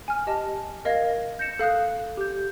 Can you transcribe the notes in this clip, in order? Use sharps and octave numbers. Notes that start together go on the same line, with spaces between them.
G#5 F6
G4 D#5 A5
A#4 D#5 F5 G#6 A#6
G6 A#6 C#7 E7
A4 F5 D#6 F#6
G4 G6